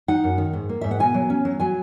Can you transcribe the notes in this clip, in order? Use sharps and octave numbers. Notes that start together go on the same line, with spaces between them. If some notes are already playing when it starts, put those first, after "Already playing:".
D#4 F#5
F#2
D#3
G#2
A#3
G#2 E5
F#5
B2 G#5
F#3
C#4
F#3
F#3 G#5